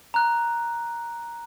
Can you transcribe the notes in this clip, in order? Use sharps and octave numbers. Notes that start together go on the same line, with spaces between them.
A#5 F#6